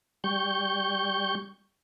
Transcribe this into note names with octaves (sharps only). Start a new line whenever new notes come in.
G3 C#6 G6